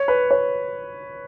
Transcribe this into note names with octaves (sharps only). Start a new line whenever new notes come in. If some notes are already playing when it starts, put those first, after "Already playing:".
Already playing: C#5
B4
C#5